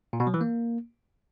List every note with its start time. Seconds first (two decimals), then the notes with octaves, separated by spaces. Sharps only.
0.13 A#2
0.20 B2
0.27 F#3
0.34 E3
0.41 A#3